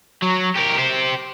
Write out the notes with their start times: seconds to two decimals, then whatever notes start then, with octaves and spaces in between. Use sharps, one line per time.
0.22 F#3
0.55 G4 A#4
0.78 G4 C5